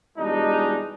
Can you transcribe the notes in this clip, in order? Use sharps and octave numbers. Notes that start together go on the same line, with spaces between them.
E2 B2 G3 G#3 D4 D#4